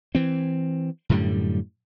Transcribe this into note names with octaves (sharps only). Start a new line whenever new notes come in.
E3 C4
F#2 A2 D3 G3